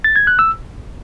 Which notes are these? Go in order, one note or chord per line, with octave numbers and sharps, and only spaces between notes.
A6
G#6
F#6
E6